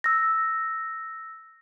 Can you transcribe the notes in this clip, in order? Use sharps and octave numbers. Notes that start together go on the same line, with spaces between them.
E6 A#6